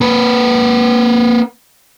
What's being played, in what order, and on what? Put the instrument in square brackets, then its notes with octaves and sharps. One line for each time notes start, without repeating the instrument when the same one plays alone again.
[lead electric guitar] A#3 B4